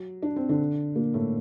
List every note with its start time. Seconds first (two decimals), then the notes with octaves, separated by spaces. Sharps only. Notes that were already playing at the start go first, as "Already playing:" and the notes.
Already playing: F#3
0.22 D4
0.36 C4
0.49 D3 D4
0.95 A#2 A#3
1.14 A2 A3